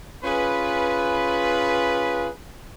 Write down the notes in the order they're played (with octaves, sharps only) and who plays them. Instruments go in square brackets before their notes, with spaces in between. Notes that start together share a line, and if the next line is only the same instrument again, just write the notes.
[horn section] C#4 F4 G#4 B4